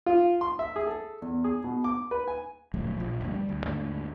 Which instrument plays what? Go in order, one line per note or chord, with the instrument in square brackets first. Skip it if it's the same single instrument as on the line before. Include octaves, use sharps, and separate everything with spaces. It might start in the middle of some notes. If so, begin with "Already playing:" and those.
[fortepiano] F4
C6
E5
G#4
A4
E2
G#4
B2
D6
B4
G#5
[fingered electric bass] D1 A#1 F#2 A3
A#1 F3
F1 D2 G2 A#3
G3
D2
D#2 G#2 D3 A3